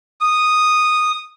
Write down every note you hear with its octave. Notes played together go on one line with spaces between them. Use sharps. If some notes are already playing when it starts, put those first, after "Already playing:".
D#6